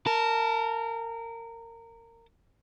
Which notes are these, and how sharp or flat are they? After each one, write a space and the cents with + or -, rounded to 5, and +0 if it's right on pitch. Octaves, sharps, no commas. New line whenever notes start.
A#4 -20 A5 +0